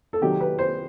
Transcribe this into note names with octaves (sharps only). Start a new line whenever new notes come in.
A4
C3 D#3 F#3 G4
B4
C5